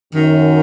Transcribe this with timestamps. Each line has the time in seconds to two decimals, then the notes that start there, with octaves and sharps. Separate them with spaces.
0.14 F#2 D#3